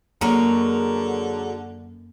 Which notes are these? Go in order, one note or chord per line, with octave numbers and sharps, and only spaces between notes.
F#2 D3 F#3 G#3 A#3 A#4